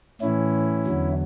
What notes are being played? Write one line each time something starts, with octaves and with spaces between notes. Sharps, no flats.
A2 E3 C#4 E4
E2 D3 F#3